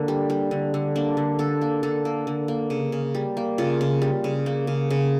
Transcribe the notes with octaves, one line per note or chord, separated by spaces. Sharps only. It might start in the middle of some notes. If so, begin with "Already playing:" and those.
Already playing: D3 A#3
G3
G3
D3
D3
A#3 D4
D3
D3 A4
A#3
D3 A4
A#3
D3
A#3
C#3
C#3
G3
A#3
C#3 F4
C#3
G3
C#3
A#3
C#3
C#3